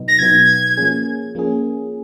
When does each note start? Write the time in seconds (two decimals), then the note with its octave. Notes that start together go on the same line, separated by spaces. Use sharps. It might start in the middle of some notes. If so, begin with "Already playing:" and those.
Already playing: B2 F#3 B3 D#4
0.08 A#6
0.19 B2 F#3 B3 D#4 G#6
0.77 F3 A#3 C#4 G#4
1.35 F3 A#3 C#4 G#4